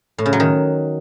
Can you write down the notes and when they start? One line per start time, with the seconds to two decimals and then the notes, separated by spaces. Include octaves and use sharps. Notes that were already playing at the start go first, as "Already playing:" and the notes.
0.18 A2
0.26 C#3
0.33 F#3
0.40 D#3